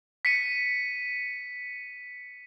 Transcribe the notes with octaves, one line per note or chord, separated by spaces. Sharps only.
B6 C#7 D#7